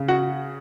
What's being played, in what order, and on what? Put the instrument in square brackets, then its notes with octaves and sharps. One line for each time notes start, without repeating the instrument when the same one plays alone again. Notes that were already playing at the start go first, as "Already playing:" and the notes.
Already playing: [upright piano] C#3
F#4 F#5